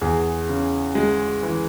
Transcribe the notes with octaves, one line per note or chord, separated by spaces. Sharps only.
E2 G#4
C#3
G#3
E3